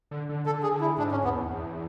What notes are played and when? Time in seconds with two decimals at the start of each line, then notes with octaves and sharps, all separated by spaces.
0.11 D3
0.29 D3
0.45 D3 A4
0.63 G#4
0.72 D3
0.81 E4
0.98 G#2 D4
1.11 C#4
1.24 E2 B3
1.51 E2